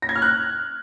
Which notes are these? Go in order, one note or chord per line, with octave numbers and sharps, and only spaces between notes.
A#6
G#6
F6
F#6